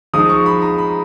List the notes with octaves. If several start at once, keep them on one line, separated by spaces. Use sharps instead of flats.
F3 G#3 D#4 D#6
C#6
B5
A#5
B5